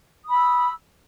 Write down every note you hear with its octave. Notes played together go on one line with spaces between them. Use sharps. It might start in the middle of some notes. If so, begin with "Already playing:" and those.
B5 D#6 E6